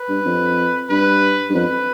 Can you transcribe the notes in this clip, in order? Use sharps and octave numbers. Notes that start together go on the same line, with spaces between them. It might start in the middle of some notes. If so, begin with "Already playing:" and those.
Already playing: B4
G2
F2
G2 B4
G2
F2 B4